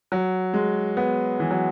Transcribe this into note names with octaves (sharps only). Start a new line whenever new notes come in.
F#3
G#3
B3
E3
F#3